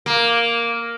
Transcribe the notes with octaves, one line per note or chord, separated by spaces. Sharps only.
A#3